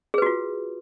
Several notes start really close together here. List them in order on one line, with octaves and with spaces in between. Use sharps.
G#4 B4 F#4 F4